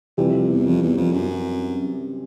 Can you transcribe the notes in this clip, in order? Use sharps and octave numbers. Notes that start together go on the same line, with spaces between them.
F2 C3 E3 G3
E2
F2
E2
F2
F#2